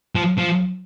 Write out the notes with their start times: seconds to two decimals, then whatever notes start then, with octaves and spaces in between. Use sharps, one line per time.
0.15 F3
0.38 F3